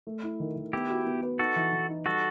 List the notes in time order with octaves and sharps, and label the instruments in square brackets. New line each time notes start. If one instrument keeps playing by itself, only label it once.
[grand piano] A3
E4
D#3
D#3
[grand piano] B3 [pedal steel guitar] E4 G4
[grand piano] F#4
B3
B4
[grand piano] D#4 [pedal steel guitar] F#4 A4
[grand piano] E3
E3
D#4
[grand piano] G3 [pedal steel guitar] F#4 A4